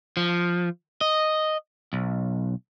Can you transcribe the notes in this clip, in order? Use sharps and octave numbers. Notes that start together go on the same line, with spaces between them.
F3
D#5
B1